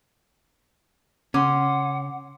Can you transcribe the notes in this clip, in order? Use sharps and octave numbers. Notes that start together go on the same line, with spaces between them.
C#3 C#4 F#5 C6 D6